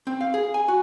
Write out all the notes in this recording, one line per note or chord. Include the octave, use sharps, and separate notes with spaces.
C4
F5
G#4
G#5
F#4